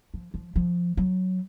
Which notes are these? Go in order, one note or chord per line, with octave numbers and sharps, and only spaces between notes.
F3
F3
F3
F#3